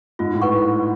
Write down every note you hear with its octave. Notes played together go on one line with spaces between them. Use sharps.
G#2 F4
A2
B4 F#5 C#6